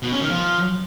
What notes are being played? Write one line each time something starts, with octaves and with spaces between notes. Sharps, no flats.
B2
C#4
D#3
F3